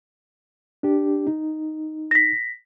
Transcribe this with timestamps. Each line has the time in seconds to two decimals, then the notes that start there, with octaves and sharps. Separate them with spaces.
0.83 D4 G4
1.27 D#4
2.11 A#6 B6